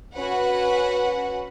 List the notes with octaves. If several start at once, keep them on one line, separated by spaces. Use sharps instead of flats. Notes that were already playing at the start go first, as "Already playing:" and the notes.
C#4 F#4 B4 F#5